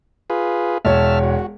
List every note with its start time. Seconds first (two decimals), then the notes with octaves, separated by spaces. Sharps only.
0.30 F4 G#4 B4
0.85 E1 C#5 E5 A5 F6
1.24 F#4